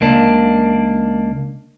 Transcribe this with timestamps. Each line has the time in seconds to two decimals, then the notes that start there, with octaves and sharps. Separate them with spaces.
0.01 C#2 A#3 D4